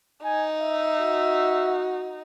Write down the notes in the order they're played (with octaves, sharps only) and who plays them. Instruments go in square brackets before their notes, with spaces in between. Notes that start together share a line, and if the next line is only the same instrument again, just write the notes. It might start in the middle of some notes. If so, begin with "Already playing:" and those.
[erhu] D#4 [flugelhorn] G#5
[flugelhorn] E5
[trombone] F#4